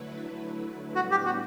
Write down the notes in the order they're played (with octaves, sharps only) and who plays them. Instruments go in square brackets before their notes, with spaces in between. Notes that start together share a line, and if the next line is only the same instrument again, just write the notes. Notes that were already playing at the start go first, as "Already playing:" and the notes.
Already playing: [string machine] D3 F#3 A3 E4 B4
[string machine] A2 G3 B3 D4 [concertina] F#4
[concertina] G4
F#4